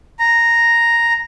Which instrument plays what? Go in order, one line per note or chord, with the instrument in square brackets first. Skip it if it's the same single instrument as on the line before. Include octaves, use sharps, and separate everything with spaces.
[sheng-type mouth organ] A#5